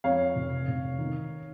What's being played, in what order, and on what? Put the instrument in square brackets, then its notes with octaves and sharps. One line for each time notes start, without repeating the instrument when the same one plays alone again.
[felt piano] F2 [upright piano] C#5 F5
[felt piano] F1
F1
D#3